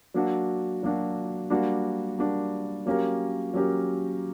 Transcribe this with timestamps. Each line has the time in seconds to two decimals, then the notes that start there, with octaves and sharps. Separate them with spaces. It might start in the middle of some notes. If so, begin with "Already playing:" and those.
0.14 F#3 A#3 D4 F#4
0.83 F#3 A#3 D4 F#4
1.50 G3 A#3 D4 F#4
2.18 G3 A#3 D4 F#4
2.86 F#3 A#3 C#4 G4 A#4
3.54 F#3 A#3 C#4 G4 A#4